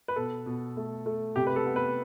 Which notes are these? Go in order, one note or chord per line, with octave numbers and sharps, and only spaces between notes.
B4
B2 A4
B2
A3
A3
C3 G4
B4
A4
B3
B4